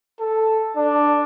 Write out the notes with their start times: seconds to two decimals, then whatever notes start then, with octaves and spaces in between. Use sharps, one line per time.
0.20 A4
0.76 D4